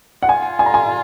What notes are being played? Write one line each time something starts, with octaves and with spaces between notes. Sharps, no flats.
F#5
F4 G#5
G#5
A#5
G#5